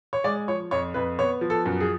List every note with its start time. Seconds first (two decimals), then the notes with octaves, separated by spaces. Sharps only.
0.13 C#5
0.24 G#3 D5
0.48 F3 C#5
0.71 F2 C#5
0.94 F2 B4
1.19 B3 C#5
1.41 F3
1.50 A4
1.66 F#2
1.81 G#4